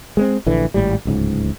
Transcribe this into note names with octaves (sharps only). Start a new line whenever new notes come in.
G#3 B3 C4
A#1 D3 E3
G#1 A2 G3
D1 C#2 G#2